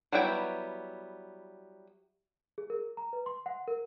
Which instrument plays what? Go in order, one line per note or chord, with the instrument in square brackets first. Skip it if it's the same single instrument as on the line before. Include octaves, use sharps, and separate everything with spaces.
[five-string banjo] F#3 G3 B3 E4 G5
[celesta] G#4
A#4
A#5
B4
C6
F#5
A#4